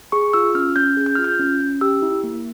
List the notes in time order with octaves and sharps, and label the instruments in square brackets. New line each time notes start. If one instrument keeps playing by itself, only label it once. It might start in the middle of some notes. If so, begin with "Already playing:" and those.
[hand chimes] G#4 C#6
F4 E6
C#4 F6
C#4 G6
G#4
G6
F4 F6
G6
C#4
C#4
G4 E6
E4
A#3